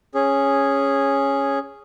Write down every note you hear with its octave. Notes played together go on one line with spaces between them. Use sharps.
C#4 G#4